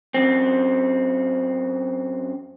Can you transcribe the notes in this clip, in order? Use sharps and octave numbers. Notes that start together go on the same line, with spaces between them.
F#2 C4